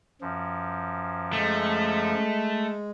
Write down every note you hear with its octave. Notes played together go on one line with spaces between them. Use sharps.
F#2 F3
G#3 A3